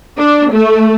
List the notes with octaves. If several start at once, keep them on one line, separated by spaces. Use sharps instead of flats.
D4
A3